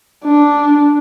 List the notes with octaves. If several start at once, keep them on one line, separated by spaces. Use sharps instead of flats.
D4